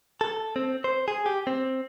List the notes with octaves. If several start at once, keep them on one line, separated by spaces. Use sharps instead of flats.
A4
C4
C5
G#4
G4
C4